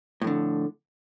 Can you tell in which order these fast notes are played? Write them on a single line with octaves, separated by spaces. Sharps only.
A2 F2 D3